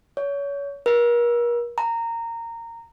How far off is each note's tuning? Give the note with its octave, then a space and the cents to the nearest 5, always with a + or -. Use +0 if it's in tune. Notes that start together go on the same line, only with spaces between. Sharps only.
C#5 +30
A#4 +40
A#5 -15